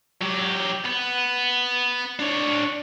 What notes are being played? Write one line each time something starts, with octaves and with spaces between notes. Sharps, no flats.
F#3 G4
B3
D4 C#5